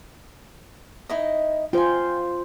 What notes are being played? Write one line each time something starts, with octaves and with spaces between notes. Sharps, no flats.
D#4 E4 D#5
F4 C5 G5 G#5